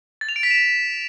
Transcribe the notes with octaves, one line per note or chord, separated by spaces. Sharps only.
A6
F7
D7
B6
E7